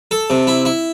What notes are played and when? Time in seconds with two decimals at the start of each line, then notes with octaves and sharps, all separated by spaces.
0.11 A4
0.30 C3
0.47 E4
0.65 E4